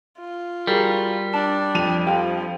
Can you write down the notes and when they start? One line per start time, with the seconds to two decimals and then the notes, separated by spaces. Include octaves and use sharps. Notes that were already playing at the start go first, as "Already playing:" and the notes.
0.18 F4
0.67 G3 F#4 G#4 A#4
1.34 D4 A5
1.75 F2 D#7 F7
2.07 F3 G4 F5 G5